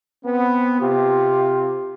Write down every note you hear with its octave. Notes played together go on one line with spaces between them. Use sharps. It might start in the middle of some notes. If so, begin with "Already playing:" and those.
B3 C4
C3 F4 G4